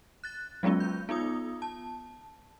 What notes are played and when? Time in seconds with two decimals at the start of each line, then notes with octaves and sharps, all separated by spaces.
0.24 F#6 A6
0.63 F#3 G#3 B3 C#4 F4
0.80 G6
1.09 B3 D#4 F4 D#6
1.62 A5